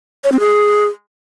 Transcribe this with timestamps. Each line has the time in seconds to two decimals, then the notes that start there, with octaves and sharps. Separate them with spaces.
0.24 C#5
0.32 C4
0.40 G#4